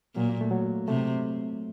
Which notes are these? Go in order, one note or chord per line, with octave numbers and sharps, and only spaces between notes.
A#2 F#3
A#3
A3
F#3
C3 A3